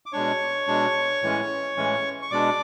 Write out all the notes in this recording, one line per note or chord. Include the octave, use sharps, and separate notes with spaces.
D6
B2 G#3 D4 C#5 C#6
B2 G#3 D4
A2 E3 G#3 C#4
A2 E3 G#3 C#4
C#6
B2 G#3 D4 D5 D6